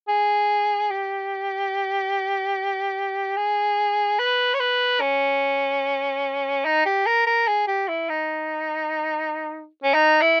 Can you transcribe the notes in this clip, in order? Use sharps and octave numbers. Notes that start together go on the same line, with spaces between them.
G#4
G4
G#4
B4
C#5
B4
C#4
D#4
G4
A#4
A#4
G#4
G4
E4
D#4
C#4
D#4
E4